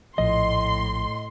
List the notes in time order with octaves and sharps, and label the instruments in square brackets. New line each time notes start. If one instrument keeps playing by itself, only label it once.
[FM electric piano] A#1 F3 A3 [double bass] A2 [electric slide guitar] D#5 [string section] C6